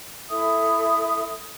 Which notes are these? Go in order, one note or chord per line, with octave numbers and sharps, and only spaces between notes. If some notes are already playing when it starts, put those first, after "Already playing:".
E4 A4 E5 D#6